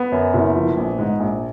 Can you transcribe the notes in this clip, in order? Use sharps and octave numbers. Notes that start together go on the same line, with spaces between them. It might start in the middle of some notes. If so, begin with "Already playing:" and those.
Already playing: B3
F#2
F#1
F3
A#1
G#2
A#1